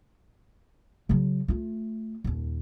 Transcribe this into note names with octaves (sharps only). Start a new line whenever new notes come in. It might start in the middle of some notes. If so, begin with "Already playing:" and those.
C#3 F#3
A3 F4
D#1 D#2